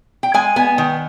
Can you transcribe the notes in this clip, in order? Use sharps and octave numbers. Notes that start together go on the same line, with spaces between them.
G5
G#3 G#5
B3 G#5
D#3